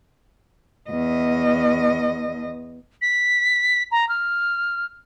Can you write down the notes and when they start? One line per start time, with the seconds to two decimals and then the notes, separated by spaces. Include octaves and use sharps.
0.90 E2 D#5
3.01 B6
3.91 A#5
4.09 F6